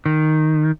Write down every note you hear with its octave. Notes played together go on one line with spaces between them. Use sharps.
D#3